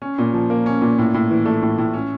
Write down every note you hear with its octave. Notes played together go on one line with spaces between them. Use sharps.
C#4
A#2
F3
A#3
C#4
A#2
A2
A2
E3
A3
A2
A2
C#4